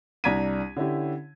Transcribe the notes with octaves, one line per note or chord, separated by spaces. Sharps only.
C2 D4 A#5 G#6 B6 D#7
D3 C#4 E4 G4